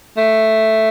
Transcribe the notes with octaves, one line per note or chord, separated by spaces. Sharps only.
A3